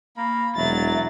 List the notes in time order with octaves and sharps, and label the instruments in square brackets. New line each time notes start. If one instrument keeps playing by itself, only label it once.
[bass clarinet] A#3 [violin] B5
[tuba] E1 [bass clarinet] F#3 [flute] E5 [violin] A6